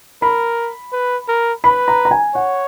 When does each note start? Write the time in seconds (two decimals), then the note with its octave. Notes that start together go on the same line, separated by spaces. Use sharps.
0.22 A#4 B5
0.93 B4
1.28 A#4
1.64 B4 B5
1.88 A#5
2.05 A#5
2.11 G#5
2.35 C#5 F#5